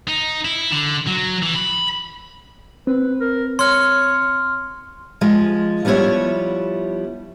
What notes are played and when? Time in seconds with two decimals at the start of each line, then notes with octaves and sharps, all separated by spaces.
0.08 D#4
0.45 E4
0.72 D3
1.07 F#3
1.42 E3
1.55 B5
2.87 C4 B4
3.20 A#4
3.59 C#5 C6 F6
5.21 F3 G#3
5.85 F3 G3 B3 E4 C#5